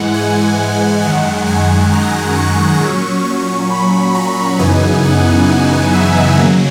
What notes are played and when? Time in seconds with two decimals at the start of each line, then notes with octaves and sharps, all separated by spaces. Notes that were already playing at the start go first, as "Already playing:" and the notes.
Already playing: G#2 E3 G#3 F#5
0.14 G#5
1.02 F#2 D#3 G#3 F#5
1.47 G#5
1.92 A#5
2.36 C#6
2.80 A#2 F#3 C#4
3.25 C#6
3.70 B5
4.14 A#5
4.59 F#2 C#3 E3 B3 D#4 G#5
5.04 F#5
5.93 E5
6.37 D#2 C#3 F#3 A#3